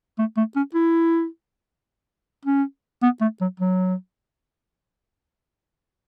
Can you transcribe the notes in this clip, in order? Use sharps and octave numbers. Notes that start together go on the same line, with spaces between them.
A3
A3
C#4
E4
C#4
B3
A3
F#3
F#3